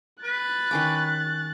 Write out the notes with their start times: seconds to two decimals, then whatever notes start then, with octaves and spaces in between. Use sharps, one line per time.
0.24 B4 F#6 A6
0.71 D#3 C#4 D6